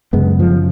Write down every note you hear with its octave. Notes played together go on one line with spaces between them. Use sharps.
F#2 C#3 G#3 B3
F3